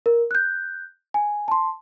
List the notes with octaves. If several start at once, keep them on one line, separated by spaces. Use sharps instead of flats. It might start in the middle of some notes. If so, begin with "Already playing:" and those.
A#4
F#6 G6
G#5
A5 C6